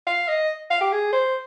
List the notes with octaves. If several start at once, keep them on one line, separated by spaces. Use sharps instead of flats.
F5
D#5
F5
G4
G#4
C5